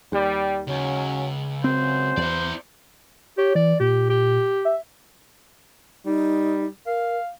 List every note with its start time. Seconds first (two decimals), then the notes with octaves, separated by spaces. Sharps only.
0.12 D#2 G3
0.68 C#2 F#3 C#4
1.64 F#2 C4 C5
2.17 E2 E4 D5
3.38 G4 C#5
3.55 E3 D5
3.80 A#2 G4
4.10 G4
4.65 E5
6.05 G3 D#4
6.86 A#4 F5